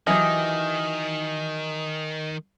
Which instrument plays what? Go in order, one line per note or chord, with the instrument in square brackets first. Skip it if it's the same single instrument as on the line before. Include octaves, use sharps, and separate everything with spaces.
[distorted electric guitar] D#3 [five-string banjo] E3 F#3 G4 [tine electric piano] D#5 [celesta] G#5 D#6 F6